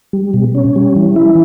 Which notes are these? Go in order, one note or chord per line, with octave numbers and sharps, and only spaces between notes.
G3
B2
C#4
G3
E3
E4